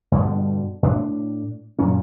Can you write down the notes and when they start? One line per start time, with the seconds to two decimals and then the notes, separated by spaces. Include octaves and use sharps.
0.12 G2 B2 D3 G3
0.83 A2 D4
1.79 F#2 A#2 F#3 C#4